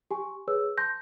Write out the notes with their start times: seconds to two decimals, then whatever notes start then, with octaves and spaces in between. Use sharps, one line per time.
0.11 G4 G#5 C#6
0.48 G#4 B4 C#5 E6
0.77 A5 C6 G6 A#6